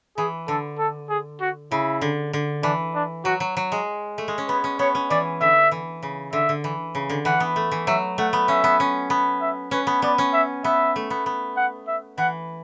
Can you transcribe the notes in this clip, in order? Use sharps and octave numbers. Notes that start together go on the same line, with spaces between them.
E3 G#4
D3 A4
A4
G#4
F#4
C#3 E4
D3
D3
E3 D4
D4
F#3 F#4
F#3
F#3
G#3
A3
G#3
C#4
B3 B4
C#4
B3 C#5
C#4
E3 D5
D3 E5
E3
C#3
D3 E5
D3
E3
C#3
D3
E3 F#5
B3
A3
E3
F#3 E5
A3 F#5
B3
C#4 E5
B3
C#4
B3
E5
C#4 B4
B3
B3 D5
C#4
E5
B3 E5
A3
B3
B3
F#5
E5
E3 F#5